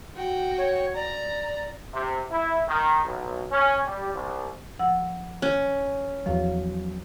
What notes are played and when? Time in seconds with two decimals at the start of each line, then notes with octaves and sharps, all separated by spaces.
0.16 F#4 G5
0.58 C#5
0.95 D5 A#5
1.94 C3
2.31 E4
2.69 D#3
3.05 B1
3.52 C#4
3.86 G3
4.15 C2
4.79 F3 F#5 E6
5.42 C#4
6.26 E2 F3 F#3 F5